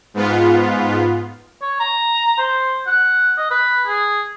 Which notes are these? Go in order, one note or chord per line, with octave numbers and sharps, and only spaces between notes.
G#2 B3 F4
C#5
A#5
C5
F#5
D#5
B4
G#4